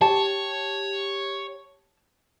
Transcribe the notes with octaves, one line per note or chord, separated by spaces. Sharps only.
G4 C#5 A5